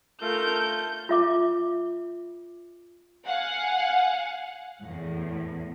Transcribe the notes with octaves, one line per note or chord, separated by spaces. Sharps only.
A3 F4 A#4 G6
F4 E5 D6
F5 F#5 G#5
E2 A2